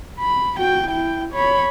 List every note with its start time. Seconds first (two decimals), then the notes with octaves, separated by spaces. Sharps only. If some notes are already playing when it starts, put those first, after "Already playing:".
0.20 B5
0.58 F#4 G5
0.89 E4 G5
1.34 C#5 B5